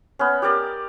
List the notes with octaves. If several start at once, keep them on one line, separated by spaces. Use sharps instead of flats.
B3 C#4
G4 A#4 D5 D#5